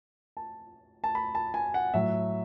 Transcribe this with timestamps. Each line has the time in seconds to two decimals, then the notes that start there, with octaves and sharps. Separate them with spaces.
0.37 A5
1.04 A5
1.15 B5
1.35 A5
1.54 G#5
1.74 F#5
1.94 A2 F#3 E5